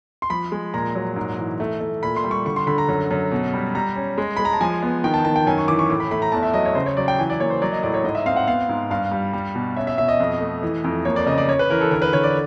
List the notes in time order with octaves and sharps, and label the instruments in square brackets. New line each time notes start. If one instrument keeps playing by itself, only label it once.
[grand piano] C6
F3 B5
G#3
A#2 A#5
F#3
G#2
E3
A3
A3
A#2 B5
C6
G3
C#6
D3 C#6
C6
D3 B5
A#5
F#2
F#2
B2
G3
G3 A#5
C#4
G#3
G#3 B5
A#5
A5
F3 G#5
B3
D#3 G5
A5
D#3 A5
G5
F#2 G#5
C#6
E3 D6
C#6
A2 D6
B5
A3 B5
A#5
E2 A5
E5
F#3 D#5
C#5
C#3 C5
C#5
F#3 D5
G5
E3 G#5
D5
A#3 C#5
C5
F#3 D5
D#5
A2 D5
C#5
G#2 D#5
E5
C4 F5
F#5
B3 F5
G#2
G2 F5
G3
G3
B2
C#4 E5
E5
B2 E5
D#5
F2
A3
E3
F2
A#3 C#5
D5
C#3 D#5
D5
C#4 C#5
B4
E3 A#4
A4
D3 A#4
B4
D3 C#5
D5